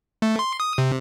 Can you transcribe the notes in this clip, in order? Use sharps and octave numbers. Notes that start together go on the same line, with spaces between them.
A3
C6
D#6
C3